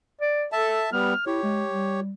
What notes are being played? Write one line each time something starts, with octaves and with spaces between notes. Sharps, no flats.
D5
A4 E5 A5
G3 B3 F6
E4 G4 C#5
G#3
G3